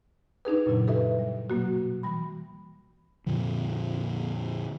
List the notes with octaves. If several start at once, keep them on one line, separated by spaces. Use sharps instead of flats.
D4 D#4 G#4 B4
F#2 A#2 C#3 F#3 E4
G4 A4 B4 D#5 E5
G3
B2 F#3 A#3 F#4
E3 G3 B5
F2 A#2 D3 F3